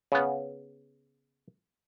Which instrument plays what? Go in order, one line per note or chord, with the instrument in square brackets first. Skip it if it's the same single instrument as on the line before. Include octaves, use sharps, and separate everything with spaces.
[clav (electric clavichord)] C#3 B3